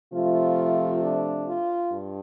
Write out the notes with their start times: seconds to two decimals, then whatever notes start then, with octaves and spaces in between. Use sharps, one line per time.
0.13 C3 F3 A3 F4
1.02 D4
1.47 F4
1.92 G2